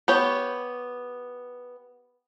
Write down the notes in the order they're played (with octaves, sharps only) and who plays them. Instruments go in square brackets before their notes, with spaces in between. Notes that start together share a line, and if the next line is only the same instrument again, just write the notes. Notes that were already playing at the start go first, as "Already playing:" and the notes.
[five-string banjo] B3 G4 C#5